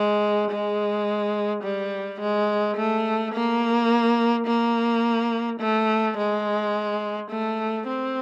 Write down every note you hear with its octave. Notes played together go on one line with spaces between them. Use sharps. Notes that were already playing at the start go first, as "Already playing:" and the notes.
Already playing: G#3
G#3
G3
G#3
A3
A#3
A#3
A3
G#3
A3
C4